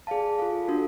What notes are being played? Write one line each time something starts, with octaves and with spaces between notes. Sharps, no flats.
G#4 D5 F5 A5
F4 A4 F5
D4 F#4 A4